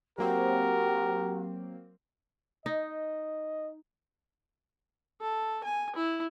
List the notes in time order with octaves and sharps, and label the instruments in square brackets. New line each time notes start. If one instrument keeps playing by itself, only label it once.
[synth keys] F#3 A#3 C4 [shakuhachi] F#4 [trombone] G4 [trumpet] A#4
[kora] D#4 [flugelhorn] D#5
[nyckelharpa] A4
G#5
E4